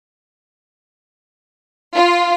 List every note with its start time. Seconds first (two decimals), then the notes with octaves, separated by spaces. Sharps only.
1.95 F4